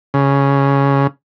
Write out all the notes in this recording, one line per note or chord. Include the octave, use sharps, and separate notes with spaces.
C#3